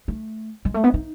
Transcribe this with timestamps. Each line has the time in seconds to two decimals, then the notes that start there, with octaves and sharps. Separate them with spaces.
0.08 A3
0.65 G#3
0.74 A3
0.84 B3
0.94 D#4